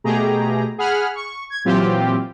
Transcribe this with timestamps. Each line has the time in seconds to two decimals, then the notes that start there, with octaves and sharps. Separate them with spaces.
0.04 B2 A3 G4 G#4 A#5
0.78 G#4 F#5 B5 F6
1.15 C#6
1.50 G#6
1.65 A#2 E3 F#3 C4 F4 G4